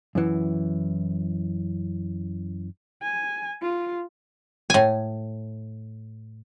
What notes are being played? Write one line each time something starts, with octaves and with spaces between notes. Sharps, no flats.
F#2 E3
G#5
F4
A2 G#5